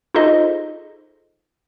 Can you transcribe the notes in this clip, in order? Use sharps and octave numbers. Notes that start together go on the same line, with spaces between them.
D#4 F4 G#4 A4 C5 D#5